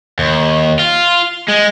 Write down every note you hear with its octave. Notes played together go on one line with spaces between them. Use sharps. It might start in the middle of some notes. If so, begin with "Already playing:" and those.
D#2
F4
G#3